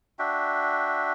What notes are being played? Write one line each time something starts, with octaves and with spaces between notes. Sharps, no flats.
D4 F#4 E5 G5